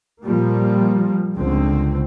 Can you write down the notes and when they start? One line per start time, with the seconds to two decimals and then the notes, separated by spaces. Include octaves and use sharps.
0.24 A#2 F3 G3 A#3
1.36 C#2 D3 C4